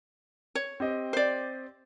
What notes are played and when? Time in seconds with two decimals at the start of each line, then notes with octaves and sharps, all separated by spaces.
0.55 C#5
0.80 C4 G4 D#5
1.13 C5 D5